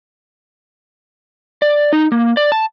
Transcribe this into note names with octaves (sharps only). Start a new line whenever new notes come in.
D5
D#4
A#3
D5
A5